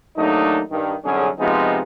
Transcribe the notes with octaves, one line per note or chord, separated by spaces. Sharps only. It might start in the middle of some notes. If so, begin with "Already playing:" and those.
D#2 F#3 A3 D4 D#4
G2 D#3
C2 F#2 D3 C#4 G#4
C3 F3 G#3 B3 D#4 F4